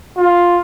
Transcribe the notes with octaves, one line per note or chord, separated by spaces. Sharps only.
F4